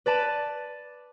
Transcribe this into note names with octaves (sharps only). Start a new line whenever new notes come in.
B4 D5 A5 D#7